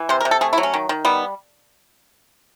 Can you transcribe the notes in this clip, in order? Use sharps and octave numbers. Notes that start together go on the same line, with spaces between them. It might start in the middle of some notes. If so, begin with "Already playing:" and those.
Already playing: E3
C3 C5
A#4
C3
A4
A3 G#4
E4
F#3
C#4
D#3
D#3
G3 B3